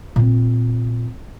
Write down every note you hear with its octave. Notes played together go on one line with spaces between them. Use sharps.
A#2 C4